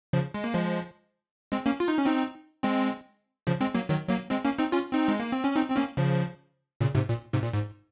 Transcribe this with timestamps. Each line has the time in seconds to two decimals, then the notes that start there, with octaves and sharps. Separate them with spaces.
0.13 C#3 F3
0.34 G#3
0.44 A#3
0.54 F3 G#3
1.52 G#3 C4
1.66 A#3 C#4
1.80 F4
1.88 D#4
1.97 C#4
2.05 C4 D#4
2.63 G#3 C4
3.47 C#3 F3
3.61 G#3 C4
3.75 F#3 A#3
3.89 D#3 F#3
4.09 F#3 A#3
4.30 G#3 C4
4.45 A#3 C#4
4.58 C4 D#4
4.72 C#4 F4
4.93 C4 D#4
5.08 G#3
5.20 A#3
5.32 C4
5.44 C#4
5.55 C4 D#4
5.70 C4
5.76 A#3 C#4
5.97 C#3 F3
6.81 A#2 C#3
6.95 G#2 C3
7.08 A#2
7.33 G#2 C3
7.43 A#2
7.54 G#2